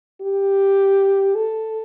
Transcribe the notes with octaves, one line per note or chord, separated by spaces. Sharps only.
G4
A4